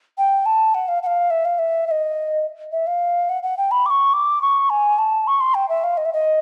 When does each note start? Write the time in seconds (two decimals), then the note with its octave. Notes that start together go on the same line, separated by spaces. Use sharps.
0.18 G5
0.46 A5
0.75 F#5
0.88 F5
1.03 F#5
1.06 F5
1.30 E5
1.45 F5
1.59 E5
1.87 E5
1.91 D#5
2.72 E5
2.87 F5
3.29 F#5
3.43 F#5
3.57 G5
3.71 B5
3.86 D6
3.90 C#6
4.13 D6
4.42 C#6
4.70 G#5
4.99 A5
5.27 C#6
5.40 C6
5.54 G5
5.69 E5
5.84 F5
5.97 D#5
6.05 E5
6.13 D#5